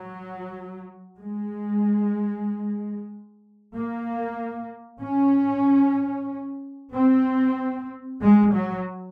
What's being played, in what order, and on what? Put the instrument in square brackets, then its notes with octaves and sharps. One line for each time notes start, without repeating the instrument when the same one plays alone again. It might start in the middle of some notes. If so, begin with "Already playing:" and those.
Already playing: [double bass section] F#3
G#3
A#3
C#4
C4
G#3
F#3